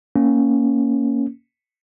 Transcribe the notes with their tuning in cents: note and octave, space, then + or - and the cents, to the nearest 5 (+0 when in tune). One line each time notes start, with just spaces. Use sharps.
A#3 +0 C#4 +0